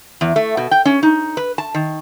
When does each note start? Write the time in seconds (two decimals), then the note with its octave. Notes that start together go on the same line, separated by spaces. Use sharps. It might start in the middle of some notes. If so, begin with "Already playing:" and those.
0.21 E2
0.36 A3
0.57 B2
0.71 G5
0.85 C#4
1.03 D#4
1.37 B4
1.58 A5
1.74 D#3